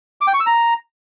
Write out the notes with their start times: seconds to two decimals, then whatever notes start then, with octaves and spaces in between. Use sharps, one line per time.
0.21 D6
0.27 G5
0.34 C#6
0.40 E6
0.46 A#5